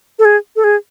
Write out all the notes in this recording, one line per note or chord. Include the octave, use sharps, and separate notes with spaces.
A4
G#4
A4
G#4